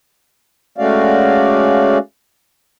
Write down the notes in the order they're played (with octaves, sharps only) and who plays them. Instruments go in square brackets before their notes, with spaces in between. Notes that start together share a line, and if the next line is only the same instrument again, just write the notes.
[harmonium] G#3 A3 C#4 F#4 D5 F5